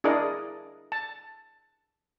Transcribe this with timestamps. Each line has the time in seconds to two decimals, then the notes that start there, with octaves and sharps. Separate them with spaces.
0.04 D4 E4 G#4 A#4 D5 D#5
0.92 A5